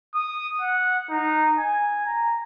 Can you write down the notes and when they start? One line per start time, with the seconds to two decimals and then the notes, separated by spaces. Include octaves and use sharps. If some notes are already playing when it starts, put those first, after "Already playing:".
0.15 D#6
0.62 F#5
1.10 D#4
1.58 G#5
2.06 A#5